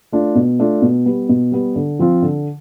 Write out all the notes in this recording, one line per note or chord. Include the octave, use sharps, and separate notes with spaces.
A3 D4 F4
B2
A3 D4 F4
B2
G3 B3
B2
G3 B3
D3
F3 C4 F4
D3